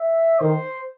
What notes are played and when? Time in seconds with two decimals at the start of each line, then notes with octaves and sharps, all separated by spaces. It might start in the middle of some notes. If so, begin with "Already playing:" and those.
Already playing: E5
0.40 D#3 C5